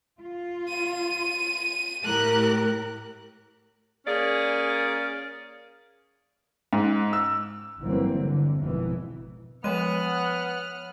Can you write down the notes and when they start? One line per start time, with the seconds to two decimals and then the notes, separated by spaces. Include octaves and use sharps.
0.22 F4
0.69 D#7
2.05 A2 G4 A#4 F#6
4.07 A#3 C#4 G#4 A#4 D5
6.73 G#2
7.13 E6
7.81 G1 E3 F#3 A#3 C4
8.19 D3
8.58 G#1 F2 B2 E3
9.64 F3 G#3 B3 C#5 F#5 F6 F#6 D#7